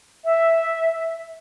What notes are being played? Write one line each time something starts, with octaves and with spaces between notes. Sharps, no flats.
E5